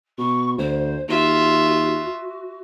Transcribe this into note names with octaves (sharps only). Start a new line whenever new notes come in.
B2 C#6
D2 C5
D#2 F4 F#4 E5